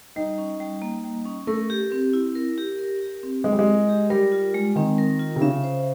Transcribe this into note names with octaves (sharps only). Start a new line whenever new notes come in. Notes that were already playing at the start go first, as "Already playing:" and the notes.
G3 D#4
C#4
G3
A#3
G3
C#4
A3 A#4
G4
C4
E4
A#4
G4
A#4
G4
C4
G#3 E4
G3
G#3
A#4
G4
G3 A#4
F4
G#3
D#3 C4
A#4
F4
C3
C#3 E5
C5